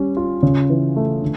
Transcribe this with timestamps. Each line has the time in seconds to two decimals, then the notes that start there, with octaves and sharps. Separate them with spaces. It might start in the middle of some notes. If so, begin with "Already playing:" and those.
Already playing: G3 C#4
0.17 F4
0.43 C#3
0.70 E3
0.96 A3
1.22 D3